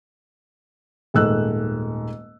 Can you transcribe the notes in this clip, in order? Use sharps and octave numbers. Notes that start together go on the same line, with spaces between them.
D#1 G#2 A3 E6 F#6